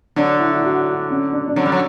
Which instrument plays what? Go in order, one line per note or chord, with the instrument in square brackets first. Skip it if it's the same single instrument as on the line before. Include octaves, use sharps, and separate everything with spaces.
[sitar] D3 F#3 [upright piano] D4
[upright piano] E4
E4
F#4
C#4
D4
D4
[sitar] D3 F#3 [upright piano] C#4
[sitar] G3
F#3